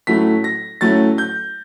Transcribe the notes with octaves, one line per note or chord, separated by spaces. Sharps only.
A2 F#3 A3 C#4 B6
A#6
A2 F#3 A3 C#4 A6
G6